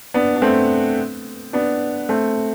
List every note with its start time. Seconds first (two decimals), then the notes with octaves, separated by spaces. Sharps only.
0.14 B3 D4
0.36 D4
0.42 A3 C4
1.53 B3 D4
2.09 A3 C4